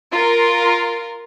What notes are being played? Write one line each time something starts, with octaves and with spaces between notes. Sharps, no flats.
F4 A#4